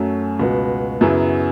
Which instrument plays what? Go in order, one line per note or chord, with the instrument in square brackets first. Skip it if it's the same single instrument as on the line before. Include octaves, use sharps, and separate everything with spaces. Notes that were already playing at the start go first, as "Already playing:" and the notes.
Already playing: [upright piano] F#2 F#3 A3 C#4
C#2 B2 B3 F#4
F#2 C#3 F#3 B3 E4